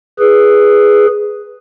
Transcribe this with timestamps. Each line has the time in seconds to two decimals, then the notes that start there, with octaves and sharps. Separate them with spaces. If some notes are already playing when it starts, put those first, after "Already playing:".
0.19 G#4 B4